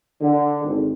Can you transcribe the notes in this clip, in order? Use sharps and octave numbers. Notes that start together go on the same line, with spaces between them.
D3
G#1